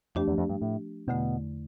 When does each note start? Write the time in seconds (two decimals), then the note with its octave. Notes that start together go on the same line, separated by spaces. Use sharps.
0.15 F2 F3 A3 D4 G4
0.27 E2
0.38 F2
0.49 G2
0.61 A2
1.07 E2 B2 D3 A3